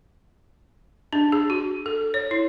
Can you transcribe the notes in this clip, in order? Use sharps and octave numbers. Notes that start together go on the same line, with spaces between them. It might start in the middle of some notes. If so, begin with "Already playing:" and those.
D4
G#4
F#4
A4
C#5
E4